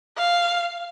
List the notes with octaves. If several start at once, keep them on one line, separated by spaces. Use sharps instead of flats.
F5